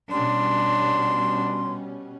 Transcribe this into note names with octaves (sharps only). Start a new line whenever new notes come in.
B2 G3 C#4 D4 C6